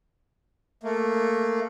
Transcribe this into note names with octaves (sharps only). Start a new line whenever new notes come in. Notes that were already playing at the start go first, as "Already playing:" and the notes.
A3 A#3